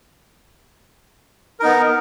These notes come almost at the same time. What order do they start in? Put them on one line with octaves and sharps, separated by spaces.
A#4 D#4 B3